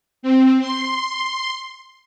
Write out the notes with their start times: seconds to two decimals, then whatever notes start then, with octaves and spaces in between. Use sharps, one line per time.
0.23 C4
0.61 C6